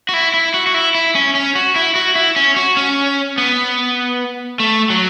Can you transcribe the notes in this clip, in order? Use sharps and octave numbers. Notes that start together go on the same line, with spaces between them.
F#4
E4
E4
F#4
F#4
E4
E4
C#4
C#4
F#4
E4
F#4
E4
C#4
F#4
C#4
B3
A3
F#3